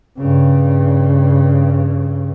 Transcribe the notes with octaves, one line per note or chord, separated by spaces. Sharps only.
G2 C#3